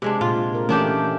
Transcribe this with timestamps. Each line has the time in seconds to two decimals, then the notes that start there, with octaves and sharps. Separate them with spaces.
0.02 C3 G#3 D4
0.21 A#2 F4
0.54 A#4
0.69 D#3 E3 A3 C#4 D4 G4